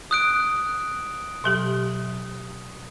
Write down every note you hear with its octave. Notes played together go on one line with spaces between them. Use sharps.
D#6 F#6 D7
B2 F#3 G4